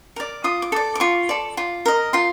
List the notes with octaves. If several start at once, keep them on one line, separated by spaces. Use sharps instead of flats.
A#4 D5
F4 D#6
D6
A4 D5
D6
F4 C#6
A4 D5
F4
A#4 D#5
F4 C6